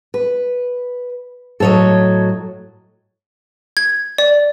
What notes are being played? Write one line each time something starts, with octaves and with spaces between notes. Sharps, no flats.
B4
A2 F#3 A4 C#5 D#5
G#6
D5